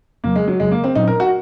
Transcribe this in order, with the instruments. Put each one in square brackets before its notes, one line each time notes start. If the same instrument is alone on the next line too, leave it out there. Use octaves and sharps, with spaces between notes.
[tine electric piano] F2 C#3 F#3 [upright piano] A#3
[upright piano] G#3
F#3
[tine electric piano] F2 C#3 F#3 [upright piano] G#3
[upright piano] A#3
C4
[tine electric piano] A#2 F#3 C#4 [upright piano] D#4
[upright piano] A#4
F#4